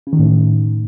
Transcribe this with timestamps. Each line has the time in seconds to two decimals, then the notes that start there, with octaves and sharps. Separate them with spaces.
0.07 C#3
0.13 D#3
0.19 A2